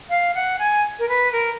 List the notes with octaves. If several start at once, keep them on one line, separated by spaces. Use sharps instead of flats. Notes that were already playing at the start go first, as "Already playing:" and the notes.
F5
F#5
G#5
A#4
B4
A#4